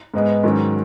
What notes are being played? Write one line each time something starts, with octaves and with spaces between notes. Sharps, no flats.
G#2 G#3 B3 D#4
G#2 D#3 F#3 C#4